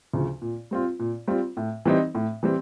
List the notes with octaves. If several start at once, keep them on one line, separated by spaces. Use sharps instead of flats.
D2 C#3 F3
A#2
G3 C4 F4
A#2
G3 C4 F4
A2
E3 G3 C4 D#4
A2
E3 G3 C4